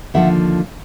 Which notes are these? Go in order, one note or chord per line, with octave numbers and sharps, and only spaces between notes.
D#2 D3 F3 E5 F#5